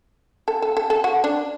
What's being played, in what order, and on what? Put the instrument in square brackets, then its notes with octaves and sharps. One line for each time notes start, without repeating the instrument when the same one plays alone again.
[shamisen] A4
A4
A4
A4
F#4
D4